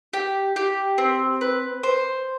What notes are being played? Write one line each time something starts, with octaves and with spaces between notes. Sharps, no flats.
G4
G4
C4
B4
C5